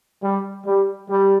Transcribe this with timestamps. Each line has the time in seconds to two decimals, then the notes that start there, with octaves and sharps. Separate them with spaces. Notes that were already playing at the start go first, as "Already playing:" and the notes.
0.23 G3
0.66 G3
1.10 G3